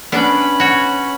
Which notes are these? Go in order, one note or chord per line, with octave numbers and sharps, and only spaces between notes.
B3 C#4 D4 B5
F#4 C#5